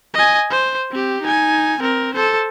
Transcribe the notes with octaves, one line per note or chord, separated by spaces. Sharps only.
D#5 G#5
C5
C4 G4
D#4 G#5
C4 A#4
A4 C5